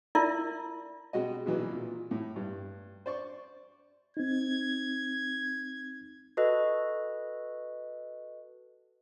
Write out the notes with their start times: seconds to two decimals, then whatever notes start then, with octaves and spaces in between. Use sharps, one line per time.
0.15 E4 F4 A#4 D5 E5
1.13 B2 G#3 F#4 G4 D#5
1.46 A#1 B2 E3 F#3
1.72 A#2
2.11 A2
2.36 G2
3.06 C5 D5 C#6
4.17 C4 D#4 G#6
6.37 F#4 A4 B4 D#5